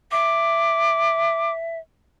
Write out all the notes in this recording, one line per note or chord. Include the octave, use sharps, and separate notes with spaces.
E5 D6